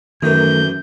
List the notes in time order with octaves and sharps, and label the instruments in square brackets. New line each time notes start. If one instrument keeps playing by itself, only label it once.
[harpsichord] F#2 E3 [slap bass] D#3 [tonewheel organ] A3 A#4 [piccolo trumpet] G6